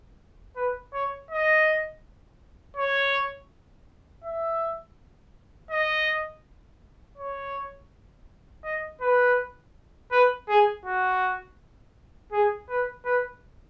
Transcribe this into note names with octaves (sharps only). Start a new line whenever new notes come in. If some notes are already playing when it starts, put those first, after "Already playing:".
B4
C#5
D#5
C#5
E5
D#5
C#5
D#5
B4
B4
G#4
F#4
G#4
B4
B4